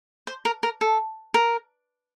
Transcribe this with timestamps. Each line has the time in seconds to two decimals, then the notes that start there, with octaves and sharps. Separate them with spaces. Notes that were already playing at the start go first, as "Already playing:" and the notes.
0.27 C5
0.45 A#4
0.63 A#4
0.81 A4
1.34 A#4